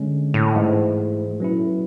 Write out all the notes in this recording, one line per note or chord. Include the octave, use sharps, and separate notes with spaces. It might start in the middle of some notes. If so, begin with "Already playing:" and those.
Already playing: D3 G#3 C#4
A2
G#2 E3 A3 E4
B2 F#3 C#4 E4
A2
B2